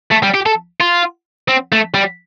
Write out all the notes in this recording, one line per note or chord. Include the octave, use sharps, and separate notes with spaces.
A3
G3
G4
A4
F4
C4
A3
G3